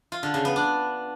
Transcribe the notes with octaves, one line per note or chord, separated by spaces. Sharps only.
F4
D3
C#3
B3
D4